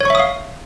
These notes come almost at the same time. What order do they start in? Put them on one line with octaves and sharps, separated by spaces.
C#5 C#6 E5 D#6 F5